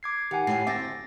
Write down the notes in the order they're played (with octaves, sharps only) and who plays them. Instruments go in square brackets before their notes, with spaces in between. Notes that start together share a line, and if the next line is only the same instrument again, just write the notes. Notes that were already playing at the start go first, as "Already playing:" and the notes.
[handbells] D6 G#6 C7
[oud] D#3 [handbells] G4 F#5 G#5
[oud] A2 [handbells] C7
[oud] D2 C4 E5 [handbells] D6 A6 A#6